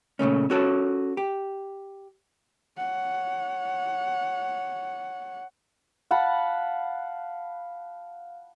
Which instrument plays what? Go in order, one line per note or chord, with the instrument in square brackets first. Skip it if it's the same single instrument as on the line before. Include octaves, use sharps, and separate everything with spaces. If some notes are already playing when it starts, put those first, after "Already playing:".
[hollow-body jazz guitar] A#2 C#3 A3 C#4
C#4 F#4 A4 C#5
G4
[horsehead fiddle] C#5 F#5
[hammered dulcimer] F5 F#5 A5 B5